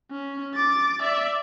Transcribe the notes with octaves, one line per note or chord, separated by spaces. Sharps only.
C#4
D6 A6
D5 E5